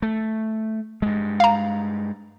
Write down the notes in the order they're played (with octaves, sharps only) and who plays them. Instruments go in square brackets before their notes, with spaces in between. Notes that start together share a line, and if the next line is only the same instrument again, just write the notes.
[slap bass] A3
G2 G#3
[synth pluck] F5 A#5